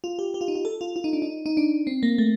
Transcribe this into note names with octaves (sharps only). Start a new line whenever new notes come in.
F4
G4
G4
F4
D#4
F4
A4
F4
F4
D#4
D4
D#4
D#4
D4
C4
A#3
A3